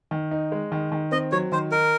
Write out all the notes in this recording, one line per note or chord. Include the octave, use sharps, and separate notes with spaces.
D#3
D#4
G#3
D#3
D#3
C4 D#5
F#3 C#5
D#3 C5
D#4 A#4